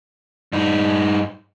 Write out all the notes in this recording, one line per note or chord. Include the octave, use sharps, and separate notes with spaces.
G2 D#4